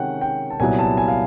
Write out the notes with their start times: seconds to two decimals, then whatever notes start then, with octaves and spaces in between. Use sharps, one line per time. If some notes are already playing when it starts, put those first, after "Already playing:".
Already playing: C3 D#3 G#3 C#4 F#5 G5
0.21 G5
0.50 A5
0.60 C2 A#2 F#3 B3 E4 G#5
0.79 A5
0.97 G#5
1.08 F5